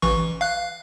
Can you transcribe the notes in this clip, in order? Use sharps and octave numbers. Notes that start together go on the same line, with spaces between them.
A1 E3 C#6
F5 F#6